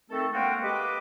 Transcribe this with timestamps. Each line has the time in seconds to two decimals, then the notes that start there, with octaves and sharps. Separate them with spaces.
0.10 D#3 A3 C4 A4
0.33 D2 G#3 A#3 F#4 F5 G5
0.63 G4 B4 D#5 B5 D6